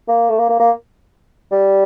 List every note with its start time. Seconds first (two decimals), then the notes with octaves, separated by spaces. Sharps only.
0.08 A#3
0.30 A3
0.39 A#3
0.50 A#3
0.60 A#3
1.52 G3